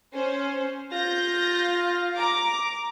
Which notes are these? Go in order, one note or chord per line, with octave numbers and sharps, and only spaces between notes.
C#4 C5
F4 G6 A#6
A#5 D6